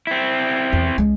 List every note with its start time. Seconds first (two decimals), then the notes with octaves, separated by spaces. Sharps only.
0.07 C4 E4
0.73 E2
0.98 C#2 G#3